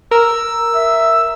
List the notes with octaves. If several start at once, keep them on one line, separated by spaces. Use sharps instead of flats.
A#4 E6
E5